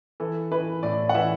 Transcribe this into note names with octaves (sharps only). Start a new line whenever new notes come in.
E3 A4
E3 B4
A2 D5
F#5
E3 E5